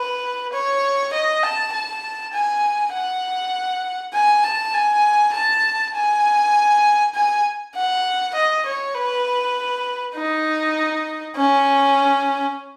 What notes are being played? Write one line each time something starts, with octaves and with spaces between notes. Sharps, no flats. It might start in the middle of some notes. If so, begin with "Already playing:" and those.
Already playing: B4
C#5
D#5
A5
A5
G#5
F#5
G#5
A5
G#5
A5
G#5
G#5
F#5
D#5
C#5
B4
D#4
C#4